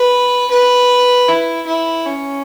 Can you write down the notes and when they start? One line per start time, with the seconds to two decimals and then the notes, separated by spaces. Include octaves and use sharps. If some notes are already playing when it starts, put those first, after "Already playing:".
Already playing: B4
0.51 B4
1.28 E4
1.67 E4
2.06 C#4